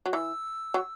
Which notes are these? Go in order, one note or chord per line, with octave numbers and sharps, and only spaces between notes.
F#3
E3 E6
F#3